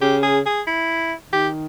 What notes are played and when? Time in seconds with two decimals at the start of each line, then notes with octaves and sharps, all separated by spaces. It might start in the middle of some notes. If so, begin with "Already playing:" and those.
0.01 C#3 G4
0.23 G#4
0.46 G#4
0.67 E4
1.32 D#3 G4